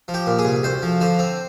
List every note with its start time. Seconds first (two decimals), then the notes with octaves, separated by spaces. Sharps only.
0.08 F3
0.14 G4
0.27 A#2
0.39 G#4
0.45 C2
0.63 D2 C5
0.82 F3
1.01 D3 C5
1.19 C4